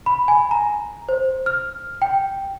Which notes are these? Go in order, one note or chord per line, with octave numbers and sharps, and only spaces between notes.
B5
G#5
A#5
C5
F6
G5